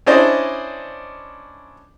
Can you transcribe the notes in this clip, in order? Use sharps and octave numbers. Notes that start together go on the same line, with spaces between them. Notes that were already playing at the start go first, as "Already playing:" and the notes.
C#4 D4 E4 C5 D5 D#5